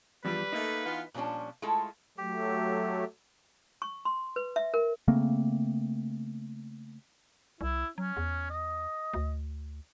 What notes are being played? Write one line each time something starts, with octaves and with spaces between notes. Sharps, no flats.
E2 G2 F3 G3 B4
A3 A#3 D#4
E3 B3 F4
A#2 F3 G3 C#4 D4
G#3 A3 E4 F4 A4
F#3 A3 G4
C#6
C6
B4
E5
A#4
C#3 A3 A#3 C4
C2 E4
F#3 C#4
E2
D#5
D2